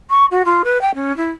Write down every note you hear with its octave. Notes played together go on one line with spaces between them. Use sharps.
C#6
F#4
F4
B4
G5
C#4
E4